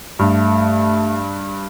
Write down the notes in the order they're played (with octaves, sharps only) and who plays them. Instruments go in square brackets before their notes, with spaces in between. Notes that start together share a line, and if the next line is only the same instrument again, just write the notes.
[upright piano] G2 [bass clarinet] A3